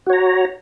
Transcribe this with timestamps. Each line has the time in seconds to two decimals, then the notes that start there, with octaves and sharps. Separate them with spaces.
0.06 F#4
0.10 C#5
0.13 A#5